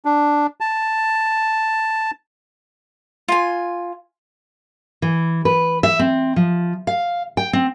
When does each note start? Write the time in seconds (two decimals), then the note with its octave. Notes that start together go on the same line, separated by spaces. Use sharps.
0.05 D4
0.60 A5
3.28 F4 G#5
5.02 E3
5.45 B4
5.83 E5
5.99 C4
6.36 F3
6.87 F5
7.37 G5
7.53 C4